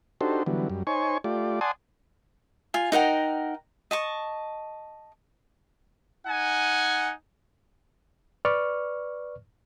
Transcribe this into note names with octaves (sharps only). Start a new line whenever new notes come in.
D4 D#4 F#4 G4 A4 C5
D3 E3 F#3 G3 B3
F#2 G3
D#4 C5 C#5 G#5 C#6
A3 F4 G4 D5
D5 F#5 G#5 A5 C6 D#6
F4 G#5
D#4 A#4 F#5 G5
D#5 A5 C#6
D#4 F#5 G#5
B4 D5 C#6 F6